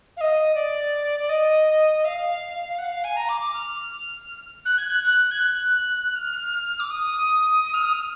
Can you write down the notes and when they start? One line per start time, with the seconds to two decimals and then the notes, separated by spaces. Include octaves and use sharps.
0.16 F5
0.20 D#5
0.54 D5
1.19 D5
1.29 D#5
2.04 F5
2.68 F5
2.78 F#5
2.91 F5
3.04 G#5
3.16 A#5
3.28 D6
3.40 D6
3.53 F6
4.65 F#6
4.77 G#6
4.90 F#6
5.02 F#6
5.31 G#6
5.40 F#6
6.15 F6
6.79 D6
6.90 D#6
7.64 D#6
7.73 F6
7.83 D#6
7.92 F6